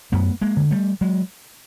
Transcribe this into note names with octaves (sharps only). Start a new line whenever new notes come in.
F#2 A3 B3
G#3 A#3
D3
G3 A3
F#3 G#3